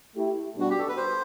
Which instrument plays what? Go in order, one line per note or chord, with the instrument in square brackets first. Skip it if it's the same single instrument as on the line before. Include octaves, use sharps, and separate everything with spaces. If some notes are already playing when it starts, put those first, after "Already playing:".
[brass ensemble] A3 E4 G4
[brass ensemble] B2 G3 B3 D4 [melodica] F#4
[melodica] G4
A4
B4
C5